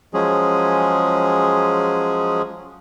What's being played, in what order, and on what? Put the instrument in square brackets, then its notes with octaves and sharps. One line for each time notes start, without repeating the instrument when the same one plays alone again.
[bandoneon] F3 F#3 G#3 C#4 G#4